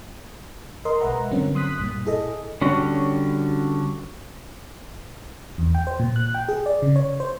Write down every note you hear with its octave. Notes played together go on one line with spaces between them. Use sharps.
A#4 D#5 C6
B1 G#3 B4 E5 F#5 A#5
G2 D3 F#3 A#3 C4 C#4
C6 D#6 F#6 B6
B1 G2 A#2
E4 G#4 A4 D#5
D3 G3 C#4 F#4 C#5
E2
G5
C5
A#2
F#6
G5
G#4
D5
C#3
C#5
C5